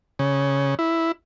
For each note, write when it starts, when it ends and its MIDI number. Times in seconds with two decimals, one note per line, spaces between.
0.19 0.75 49
0.79 1.12 64